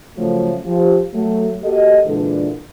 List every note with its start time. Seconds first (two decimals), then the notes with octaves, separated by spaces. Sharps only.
0.17 C#3 F3 F#3 A3
0.65 F3 G4
1.13 F#3 A3
1.62 A#3 F#4 G4 A4 D#5
2.05 A#2 D3 E3 G#3 D4 A4